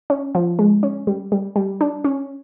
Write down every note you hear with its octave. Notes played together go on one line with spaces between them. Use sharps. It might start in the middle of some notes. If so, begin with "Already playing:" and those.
C#4
F3
G#3
C#4
G3
G3
G3
D4
C#4